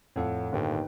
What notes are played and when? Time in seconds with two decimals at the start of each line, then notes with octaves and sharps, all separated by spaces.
0.16 F2 A2 A4 C#5 F5 F#5
0.52 G1 D#2 D#4 B4 G5